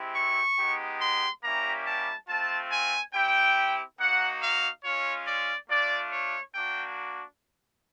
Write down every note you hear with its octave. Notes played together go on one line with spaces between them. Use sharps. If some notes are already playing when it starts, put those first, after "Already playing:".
Already playing: G#3 C4 E4 G4
C#6
G#3 B3 D#4 G4
C6
G3 A#3 C#4 E4 G4 A#5
A5
A3 C4 F4 A5
G#5
C4 E4 G4 G5
A#3 D#4 F#4 F#5
F5
G#3 C#4 F4 C#5
D5
A3 D4 F4 D5
C#5
A#3 D4 F#4 G5